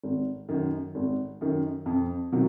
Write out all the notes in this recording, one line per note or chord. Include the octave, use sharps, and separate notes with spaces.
G#1
F#2 D#3
G#1
F#2 D#3
F2
C3 D#3 F#3